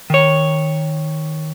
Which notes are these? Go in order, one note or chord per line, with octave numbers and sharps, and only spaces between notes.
D#3 C#5